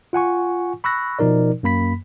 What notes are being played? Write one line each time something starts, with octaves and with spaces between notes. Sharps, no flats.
F4 F#5 G#5 C#6
B5 C#6 E6 F#6 A#6
B2 F3 D#4 A#4 D5
F#2 A#3 B5 B6